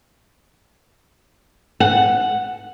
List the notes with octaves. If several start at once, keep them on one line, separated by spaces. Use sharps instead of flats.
F#5